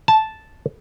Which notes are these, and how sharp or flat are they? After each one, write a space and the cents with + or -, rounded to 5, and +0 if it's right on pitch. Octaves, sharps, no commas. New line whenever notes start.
A5 -5